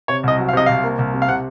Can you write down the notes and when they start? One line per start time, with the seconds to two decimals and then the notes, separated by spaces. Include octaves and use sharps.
0.08 C3 C#5
0.23 C2 D#5
0.38 F#3
0.49 F5
0.53 C3 D#5
0.66 C2 F5
0.83 A#3
0.99 C2
1.14 C3
1.22 F5
1.28 C3 F#5